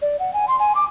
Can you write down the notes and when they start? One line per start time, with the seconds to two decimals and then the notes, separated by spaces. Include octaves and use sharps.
0.02 D5
0.19 F#5
0.34 G#5
0.48 C6
0.59 G#5
0.75 D6